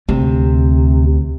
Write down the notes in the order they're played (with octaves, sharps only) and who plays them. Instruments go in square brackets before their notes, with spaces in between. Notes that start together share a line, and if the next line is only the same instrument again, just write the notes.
[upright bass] D2 [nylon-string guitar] C3